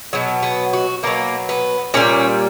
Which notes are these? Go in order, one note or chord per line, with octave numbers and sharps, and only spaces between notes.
B2 F#3 B3
B3
F#4
B2 F#3 A#3
B3
A#2 G3 C#4